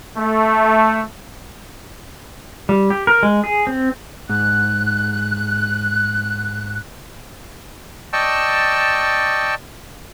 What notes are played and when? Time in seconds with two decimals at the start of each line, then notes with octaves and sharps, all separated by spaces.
0.17 A3
2.69 G3
2.90 G4
3.07 A#4
3.23 G#3
3.44 G#4
3.67 C4
4.29 G#2 F#6
8.13 D5 D#5 G5 A5 C#6 E6